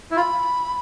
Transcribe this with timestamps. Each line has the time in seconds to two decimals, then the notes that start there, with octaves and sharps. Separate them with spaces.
0.11 E4
0.16 F4 B5